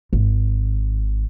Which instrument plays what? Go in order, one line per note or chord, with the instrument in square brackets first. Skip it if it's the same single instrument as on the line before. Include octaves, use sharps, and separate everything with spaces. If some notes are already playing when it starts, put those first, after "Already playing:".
[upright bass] G#1